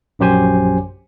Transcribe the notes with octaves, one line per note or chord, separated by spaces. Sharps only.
A#1 F#2 F#3 G4 C5 G#5